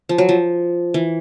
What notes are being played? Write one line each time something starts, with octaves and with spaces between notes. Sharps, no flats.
F3
F#3
F3
E3